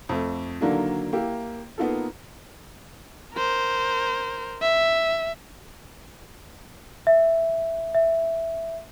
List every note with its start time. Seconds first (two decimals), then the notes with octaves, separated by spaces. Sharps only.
0.09 F2 A3
0.61 D3 D#3 F#3 A#3 D4 E4
1.13 A#3 E4 G4
1.78 A#3 B3 D#4 F4 A4
3.34 A#4 C5
4.62 E5
7.07 E5
7.95 E5